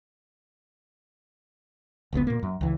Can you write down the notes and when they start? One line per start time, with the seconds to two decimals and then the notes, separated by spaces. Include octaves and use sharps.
2.13 F1 C#2 A2 B3
2.27 A#2 A#3
2.43 F#2
2.61 C#2 E3